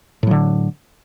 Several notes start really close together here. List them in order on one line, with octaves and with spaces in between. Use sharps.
A2 F#3 D3